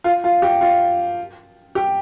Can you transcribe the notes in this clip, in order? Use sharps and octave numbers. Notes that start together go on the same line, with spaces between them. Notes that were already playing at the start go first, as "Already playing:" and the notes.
F4
F4
G4
F4
G4